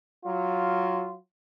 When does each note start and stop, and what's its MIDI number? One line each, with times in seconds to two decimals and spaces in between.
0.24 1.15 54
0.24 1.15 65